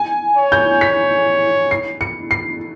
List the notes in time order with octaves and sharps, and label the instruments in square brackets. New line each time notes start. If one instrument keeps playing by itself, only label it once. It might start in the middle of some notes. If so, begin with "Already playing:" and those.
Already playing: [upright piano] G#5
[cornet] C#5
[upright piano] G6
B6
C7
C#7
C7